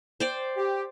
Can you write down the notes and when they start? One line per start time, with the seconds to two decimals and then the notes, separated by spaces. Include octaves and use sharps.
0.20 C5 D5 G5
0.57 G4